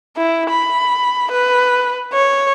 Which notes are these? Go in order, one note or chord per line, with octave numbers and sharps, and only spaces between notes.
E4
B5
B4
C#5